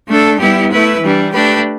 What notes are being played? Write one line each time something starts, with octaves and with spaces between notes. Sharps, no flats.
A3 D4 A4
G3 B3 E4 G4
A3 E4 B4
E3 G3 D4
A3 D4 G4 B4